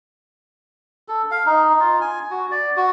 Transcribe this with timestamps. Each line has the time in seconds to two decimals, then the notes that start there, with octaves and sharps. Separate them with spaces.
1.08 A4
1.31 F5
1.46 D#4
1.80 F4
2.01 G#5
2.31 F#4
2.51 D5
2.77 F#4